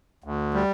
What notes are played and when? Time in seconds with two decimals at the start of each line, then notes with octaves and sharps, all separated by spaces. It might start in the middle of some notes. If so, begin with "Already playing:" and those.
0.24 D2
0.54 G3